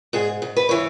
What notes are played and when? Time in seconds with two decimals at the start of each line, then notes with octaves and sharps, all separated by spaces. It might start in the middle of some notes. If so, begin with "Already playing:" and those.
0.13 G#2 G#4
0.42 G#2
0.56 B4
0.69 E3 C#5